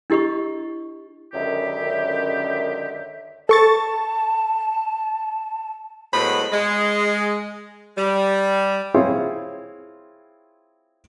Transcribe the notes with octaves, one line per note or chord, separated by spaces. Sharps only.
D4 E4 G4 D#5 C#6
C#2 F#2 D3 D#3 G4 E5
A4 A5 C#6 A6
A2 F#3 G#3 B3 C5 B5
G#3
G3
C4 E4 F4 G#4 C#5